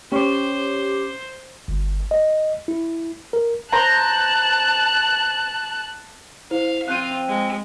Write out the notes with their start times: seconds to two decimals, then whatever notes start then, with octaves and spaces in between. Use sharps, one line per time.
0.12 C#4 G4 C5 C#5 D6
1.68 G1
2.11 D#5
2.68 E4
3.33 A#4
3.72 C5 A5 A#5 F#6
6.51 E4 C5 F5
6.88 F3 C4 F4 F5 F#6 G6 D#7
7.28 G#3